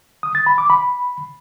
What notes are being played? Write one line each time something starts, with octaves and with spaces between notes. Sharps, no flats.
D#6
A6
B5
D6
B5